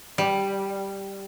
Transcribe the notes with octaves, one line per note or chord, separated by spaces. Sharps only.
G3